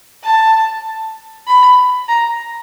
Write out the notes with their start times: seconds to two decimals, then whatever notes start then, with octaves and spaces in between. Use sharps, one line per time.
0.24 A5
1.47 B5
2.08 A#5